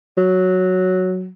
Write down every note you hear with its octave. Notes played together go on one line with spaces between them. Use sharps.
F#3